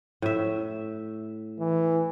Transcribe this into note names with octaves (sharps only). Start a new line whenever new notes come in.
A2 E5
E3